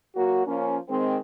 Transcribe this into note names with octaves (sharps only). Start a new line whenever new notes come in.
F#3 A#3 F#4
F3 A#3 C#4
D#3 G#3 C4